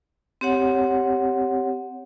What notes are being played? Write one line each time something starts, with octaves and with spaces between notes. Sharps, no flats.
C4 G4 C#5 F#5